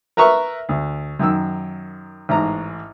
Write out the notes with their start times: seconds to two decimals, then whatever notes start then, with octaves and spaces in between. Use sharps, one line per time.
0.17 A#4 B4 E5 A#5 C#6
0.69 D2
1.19 F#2 D#3 E6
2.29 A1 G#2 A#5